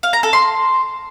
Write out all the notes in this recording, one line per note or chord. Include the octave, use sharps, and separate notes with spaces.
F5
A#5
A4
C6